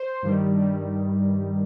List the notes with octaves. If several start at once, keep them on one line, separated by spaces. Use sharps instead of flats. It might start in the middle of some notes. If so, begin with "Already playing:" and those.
Already playing: C5
G2 D#3 G3
G2 D#3 G3